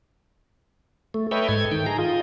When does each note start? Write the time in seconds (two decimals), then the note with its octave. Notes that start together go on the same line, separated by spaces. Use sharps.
1.14 A3
1.31 A4 B4 C#5 D#5 E5 G5
1.48 G#2 A4 G#6
1.72 D#3 G5
1.86 G#4 A#5
1.98 F4 D#5